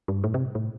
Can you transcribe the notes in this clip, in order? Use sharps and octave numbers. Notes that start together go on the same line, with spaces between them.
G2
A2
C3
A2